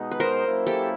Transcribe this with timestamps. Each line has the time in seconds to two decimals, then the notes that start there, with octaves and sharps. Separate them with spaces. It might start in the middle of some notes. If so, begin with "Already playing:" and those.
Already playing: B2 G#3 B3 D#4
0.11 B4
0.20 A#4 C5
0.47 F#3 A#3 C#4 E4
0.67 G4 A4